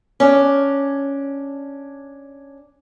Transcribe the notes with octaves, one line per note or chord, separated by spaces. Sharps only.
C#4 D4